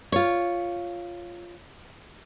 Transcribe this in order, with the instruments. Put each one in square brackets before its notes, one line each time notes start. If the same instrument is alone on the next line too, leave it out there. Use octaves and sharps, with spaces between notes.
[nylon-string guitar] F4 C#5